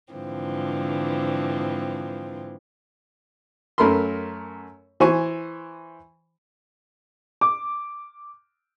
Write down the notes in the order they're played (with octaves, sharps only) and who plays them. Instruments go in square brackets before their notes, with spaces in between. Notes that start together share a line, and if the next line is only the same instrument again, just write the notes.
[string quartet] G#2 D3 E3 F3 C4
[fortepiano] F#2 A3 A#4 B5 C6
E3 C5 G#5 C#6
[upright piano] D6